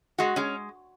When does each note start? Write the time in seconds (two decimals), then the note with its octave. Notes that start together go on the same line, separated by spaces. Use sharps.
0.18 G#3 F#4
0.36 G#3 C#4